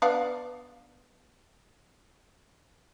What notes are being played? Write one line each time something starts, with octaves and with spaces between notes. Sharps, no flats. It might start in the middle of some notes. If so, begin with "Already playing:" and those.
B3 D4 F5